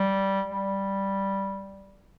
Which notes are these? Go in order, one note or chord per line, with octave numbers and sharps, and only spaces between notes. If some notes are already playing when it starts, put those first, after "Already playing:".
Already playing: G3
G3